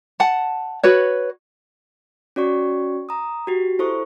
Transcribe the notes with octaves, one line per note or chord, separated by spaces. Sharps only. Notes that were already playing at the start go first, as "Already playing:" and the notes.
F#5 A5
F#4 B4 C#5
C#4 F#4 D5 C#6
A#5 D#6
F#4 G4
E4 A4 C5 C#6